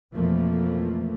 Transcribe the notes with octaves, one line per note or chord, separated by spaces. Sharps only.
F2 B2 E3 F3 A3 A#3